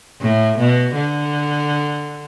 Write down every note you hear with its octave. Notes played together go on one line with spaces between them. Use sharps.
A2
B2
D3